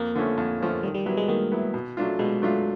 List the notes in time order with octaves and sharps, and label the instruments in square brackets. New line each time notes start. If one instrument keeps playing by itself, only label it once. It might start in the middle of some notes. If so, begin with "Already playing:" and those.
Already playing: [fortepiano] F2 [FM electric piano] A#3
[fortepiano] D3 F3 A3 C#4
F2
D3 F3 A3 C#4
[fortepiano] D#3 [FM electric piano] G3
[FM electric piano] G3
[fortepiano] F#3 B3 E4 [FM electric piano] G3
[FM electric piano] G#3
[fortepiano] D#3 [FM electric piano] A#3
[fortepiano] F#3 B3 E4
B2
F#3 A3 D4 F4
[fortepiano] B2 [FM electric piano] G#3
[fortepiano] F#3 A3 D4 F4